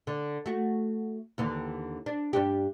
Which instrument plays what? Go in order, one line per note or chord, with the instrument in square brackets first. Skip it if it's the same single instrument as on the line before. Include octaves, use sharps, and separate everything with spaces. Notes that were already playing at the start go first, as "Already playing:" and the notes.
[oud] D3
A3 F#4
D#2 D3 E3
D4
G2 D4 G4